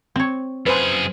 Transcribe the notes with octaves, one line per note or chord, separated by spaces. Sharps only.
C4 C#5
F#2 G#4 B4 C5 G#5